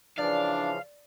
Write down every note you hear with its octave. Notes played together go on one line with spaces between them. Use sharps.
C#3 E3 F3 D4 D5 F5